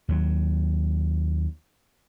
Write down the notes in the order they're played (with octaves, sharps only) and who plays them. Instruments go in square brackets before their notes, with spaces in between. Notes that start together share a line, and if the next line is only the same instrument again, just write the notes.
[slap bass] D#2 F#3